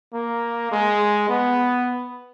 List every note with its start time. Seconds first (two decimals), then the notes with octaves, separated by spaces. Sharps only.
0.14 A#3
0.71 G#3
1.29 B3